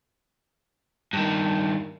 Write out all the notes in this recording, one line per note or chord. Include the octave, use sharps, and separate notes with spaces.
G2 D#3